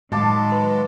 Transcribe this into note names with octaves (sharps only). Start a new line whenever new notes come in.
A2 D#3 F#3 G#3 F5 A5 D6
B4